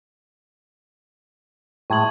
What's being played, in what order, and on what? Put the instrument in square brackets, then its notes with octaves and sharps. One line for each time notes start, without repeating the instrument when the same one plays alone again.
[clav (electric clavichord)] A2 G#3 [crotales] C#6 G#6 F#7